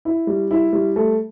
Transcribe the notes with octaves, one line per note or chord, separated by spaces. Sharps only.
E4
G3
E4
G3
A3